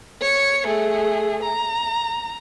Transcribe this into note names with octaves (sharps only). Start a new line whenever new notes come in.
C#5 C#7
A3 G#4
A#5